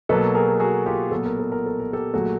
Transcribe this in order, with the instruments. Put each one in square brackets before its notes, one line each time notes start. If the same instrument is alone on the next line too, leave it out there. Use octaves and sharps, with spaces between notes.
[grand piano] B2 F#3 A#3 A4 B4
G#4 A#4
F#4 G#4
F4 G4
A#2 F#3 B3 A4
A#4
A4
A#4
A4
A#4
G4 A4
A#2 F#3 A3 F#4 G#4